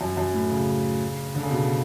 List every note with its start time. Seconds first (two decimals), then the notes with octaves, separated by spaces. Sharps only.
0.01 F#2
0.17 F#2
0.34 A2
0.51 C#3
1.35 D3
1.43 C#3
1.51 B2